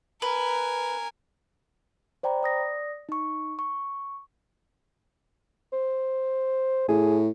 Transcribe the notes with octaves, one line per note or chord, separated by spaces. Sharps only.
A#4 B4 G#5
C5 D5 G5 A#5 B5
D5 D#6 A#6
D#4 C#6
C#6
C5
A2 G#4